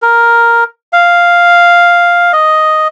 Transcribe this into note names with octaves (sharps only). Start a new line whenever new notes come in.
A#4
F5
D#5